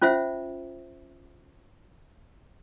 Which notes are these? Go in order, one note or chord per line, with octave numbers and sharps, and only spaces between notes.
C#4 F4 C5 E5 F#5